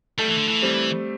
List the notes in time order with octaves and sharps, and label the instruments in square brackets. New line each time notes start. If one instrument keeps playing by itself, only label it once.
[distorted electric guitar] G3 [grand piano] A3
[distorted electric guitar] E3
D3
E3
[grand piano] G3 C4